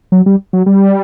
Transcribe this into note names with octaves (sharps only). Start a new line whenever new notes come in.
F#3
G3
F#3
G3